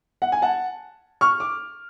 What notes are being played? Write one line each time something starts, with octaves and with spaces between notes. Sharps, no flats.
F#5
G#5
F#5 A5
C#6 F6
D6